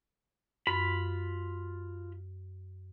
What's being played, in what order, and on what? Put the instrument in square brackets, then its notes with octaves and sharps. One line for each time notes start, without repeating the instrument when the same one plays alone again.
[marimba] F#2 [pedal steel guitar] F4 B5